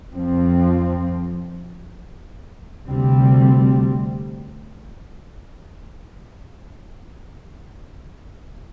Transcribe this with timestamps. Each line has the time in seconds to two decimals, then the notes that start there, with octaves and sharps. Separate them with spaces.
0.15 F2 F3 C4
2.87 D2 C3 G3 C4